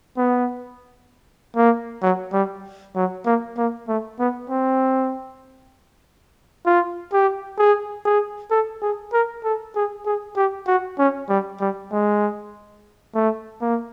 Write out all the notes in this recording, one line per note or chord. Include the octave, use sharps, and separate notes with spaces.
B3
A#3
F#3
G3
F#3
A#3
A#3
A3
B3
C4
F4
G4
G#4
G#4
A4
G#4
A#4
A4
G#4
G#4
G4
F#4
C#4
G3
G3
G#3
A3
A#3